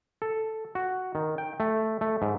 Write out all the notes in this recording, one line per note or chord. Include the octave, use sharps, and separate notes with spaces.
A4
F#4
D#3
G5
A3
A3
G#2